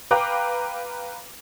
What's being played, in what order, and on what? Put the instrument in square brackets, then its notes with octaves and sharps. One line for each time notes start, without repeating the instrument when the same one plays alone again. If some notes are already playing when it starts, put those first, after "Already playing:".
[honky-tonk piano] B4 F5 G5 A#5 D6 F#6